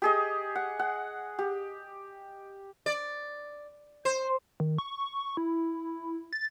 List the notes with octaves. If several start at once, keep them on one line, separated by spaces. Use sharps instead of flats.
G4 G#4 D#5
F#5
F#5
G4
D5
C5
D#3
C#6
E4
A6